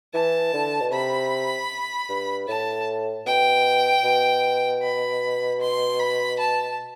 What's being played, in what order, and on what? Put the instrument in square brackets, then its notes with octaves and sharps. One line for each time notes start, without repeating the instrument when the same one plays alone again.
[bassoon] E3 [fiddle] A5
[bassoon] D3
B2
[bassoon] C3 [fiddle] B5
[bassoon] G2
[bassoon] A2 [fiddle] A5
[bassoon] B2 [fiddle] G5
[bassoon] B2
[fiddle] B5
C6
B5
A5